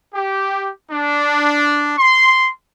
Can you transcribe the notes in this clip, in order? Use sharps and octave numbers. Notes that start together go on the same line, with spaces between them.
G4
D4
C6